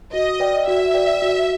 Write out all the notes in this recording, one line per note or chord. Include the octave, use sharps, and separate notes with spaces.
F#4 D#5
B4 D5 G5
F#4 E5
B4 D5 G5
F#4